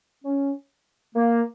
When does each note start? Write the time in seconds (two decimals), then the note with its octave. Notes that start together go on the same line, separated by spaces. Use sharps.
0.24 C#4
1.15 A#3